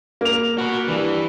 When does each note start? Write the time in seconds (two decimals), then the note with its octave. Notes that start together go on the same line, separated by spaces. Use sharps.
0.21 A#3 F7
0.58 F#4 B4
0.88 G2 E3